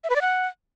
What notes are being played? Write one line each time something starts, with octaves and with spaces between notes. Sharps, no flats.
E5
B4
D5
F#5